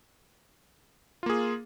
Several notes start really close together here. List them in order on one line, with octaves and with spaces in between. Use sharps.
F4 A#3 G#4